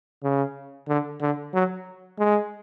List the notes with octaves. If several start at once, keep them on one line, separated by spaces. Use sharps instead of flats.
C#3
D3
D3
F#3
G#3